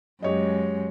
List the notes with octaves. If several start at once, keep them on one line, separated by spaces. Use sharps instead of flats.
F#2 G#3 G4 C#5 D#5